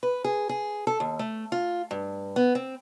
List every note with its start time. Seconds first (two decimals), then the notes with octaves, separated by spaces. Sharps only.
0.03 B4
0.24 G#4
0.49 G#4
0.87 A4
1.00 D#2
1.19 A3
1.52 F4
1.91 G2
2.36 B3
2.55 C4